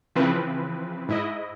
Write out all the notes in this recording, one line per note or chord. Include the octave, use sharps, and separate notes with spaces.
C#3 E3 F3 C4 B4
G#2 E4 D#5